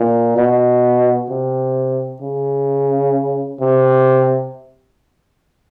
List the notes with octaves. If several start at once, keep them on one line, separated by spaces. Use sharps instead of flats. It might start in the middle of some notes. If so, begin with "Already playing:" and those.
Already playing: A#2
B2
C3
C#3
C3